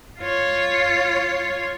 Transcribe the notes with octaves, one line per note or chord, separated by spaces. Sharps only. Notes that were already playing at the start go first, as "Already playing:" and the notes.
F4 C#5